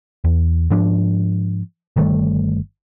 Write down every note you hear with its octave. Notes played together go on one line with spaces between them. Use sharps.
E2
G#2 F3 D4
G1 D#3 G3 A3